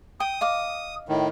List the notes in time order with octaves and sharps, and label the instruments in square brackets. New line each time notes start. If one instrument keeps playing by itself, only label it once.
[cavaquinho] G5 [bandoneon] D#6
[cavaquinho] D#5 F5 D6
[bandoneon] A2 D#3